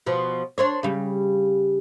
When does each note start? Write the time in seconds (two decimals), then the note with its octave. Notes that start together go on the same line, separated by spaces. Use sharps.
0.06 B2 F3
0.58 D4 C5 C#5
0.83 C#3 G3